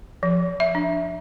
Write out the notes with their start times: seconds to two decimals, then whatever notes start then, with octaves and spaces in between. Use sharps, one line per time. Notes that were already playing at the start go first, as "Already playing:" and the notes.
0.23 F3
0.60 E5
0.75 D4